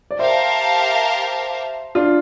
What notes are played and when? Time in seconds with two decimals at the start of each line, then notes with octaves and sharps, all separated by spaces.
0.11 D5
0.19 G4 A#4 C5 E5 F5 A5
1.95 D4 F4